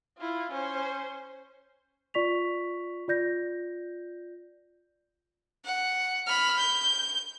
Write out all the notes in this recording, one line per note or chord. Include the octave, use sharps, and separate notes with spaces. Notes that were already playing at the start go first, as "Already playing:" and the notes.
E4 F4
C#4 C5
F4 D5 C#6 B6 F7
F4 D5 G6 A#6
F#5
B5 F6
G6